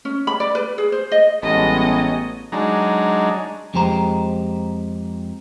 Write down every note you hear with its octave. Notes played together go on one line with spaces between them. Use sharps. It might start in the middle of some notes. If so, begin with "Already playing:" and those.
C#4
B5
D5
B4
G#4
C5
D#5
A1 G3 G#3 B3 C#5 D#5 A5
F#3 G#3 D4 D#4
F2 G#3 G4 C5 A#5